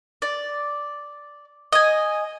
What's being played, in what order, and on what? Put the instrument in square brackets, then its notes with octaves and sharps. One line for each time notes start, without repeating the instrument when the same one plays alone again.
[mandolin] D5
D#5 G#5